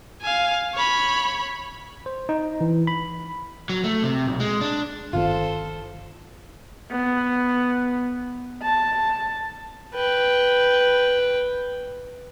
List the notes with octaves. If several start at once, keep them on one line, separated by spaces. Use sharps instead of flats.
F5 G#5
C#5 B5
C5
D#4
E3
B5
F#3
A3
C3
B1
G#3
D4
G1 D#3 C4 F4 A4 C5
B3
A5
B4 G5